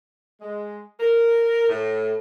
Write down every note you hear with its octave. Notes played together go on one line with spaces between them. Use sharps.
G#3
A#4
A2